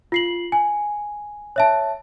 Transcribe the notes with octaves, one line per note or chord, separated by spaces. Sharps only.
F4 C7 F#7
G#5
C#5 E5 A5